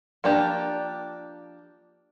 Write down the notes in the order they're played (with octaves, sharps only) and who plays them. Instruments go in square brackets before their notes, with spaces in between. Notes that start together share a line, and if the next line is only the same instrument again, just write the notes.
[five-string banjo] F3 A#3 D4 G4